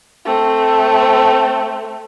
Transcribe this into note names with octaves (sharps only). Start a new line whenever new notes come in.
A3 C4